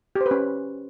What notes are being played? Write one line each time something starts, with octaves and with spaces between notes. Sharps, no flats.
G4
C5
B4
C#4